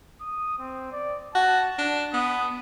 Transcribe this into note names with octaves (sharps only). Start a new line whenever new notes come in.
D#6
C4
D5
F#4 A5
D4
B3 D#6